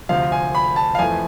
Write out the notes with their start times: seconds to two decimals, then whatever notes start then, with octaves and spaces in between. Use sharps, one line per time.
0.09 D2 C3 F3 F5
0.32 G#5
0.55 B5
0.76 A5
0.95 F5
0.99 F2 E3 A3 G#5